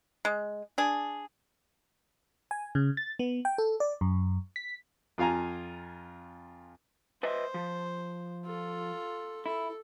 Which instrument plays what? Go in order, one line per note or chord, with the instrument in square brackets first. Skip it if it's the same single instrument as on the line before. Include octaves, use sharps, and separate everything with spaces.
[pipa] G#3
D4 G#4
[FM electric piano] G#5
C#3
A6
B3
G5
A4
D5
F#2
B6
[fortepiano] F2 F4 F5 G#5 A#5
[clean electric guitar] B4 D#5 E5 [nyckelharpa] C5
[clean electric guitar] F3
[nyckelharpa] F4 A4
[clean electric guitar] E4 [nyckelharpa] A4